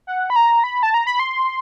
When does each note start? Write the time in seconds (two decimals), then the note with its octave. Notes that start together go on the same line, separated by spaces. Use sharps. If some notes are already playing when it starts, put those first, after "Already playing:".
0.07 F#5
0.30 B5
0.36 A#5
0.64 B5
0.83 A5
0.94 A#5
1.07 B5
1.20 C6